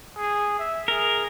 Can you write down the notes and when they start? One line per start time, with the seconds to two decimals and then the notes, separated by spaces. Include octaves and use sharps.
0.17 G#4
0.59 E5
0.88 G#4 A#4